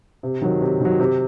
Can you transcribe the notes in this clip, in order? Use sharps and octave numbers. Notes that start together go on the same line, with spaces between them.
C3
D#3 F#3
C3
D#3 F#3
C3